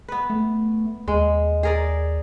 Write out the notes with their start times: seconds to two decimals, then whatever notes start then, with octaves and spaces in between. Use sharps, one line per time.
0.08 B3 B4
0.30 A3
1.08 D#2 G#3
1.63 G#4 A#4 D5